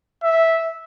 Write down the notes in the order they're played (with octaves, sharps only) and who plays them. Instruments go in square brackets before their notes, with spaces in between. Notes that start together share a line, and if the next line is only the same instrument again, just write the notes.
[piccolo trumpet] E5